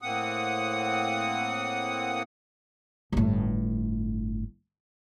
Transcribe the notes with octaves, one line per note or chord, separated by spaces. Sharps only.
A2 A#3 C4 F#5 D#6
G1 A2